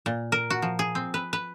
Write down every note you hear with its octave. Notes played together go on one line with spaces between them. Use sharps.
A#2
A#4
F#4
F3
G#4
C4
B4
B4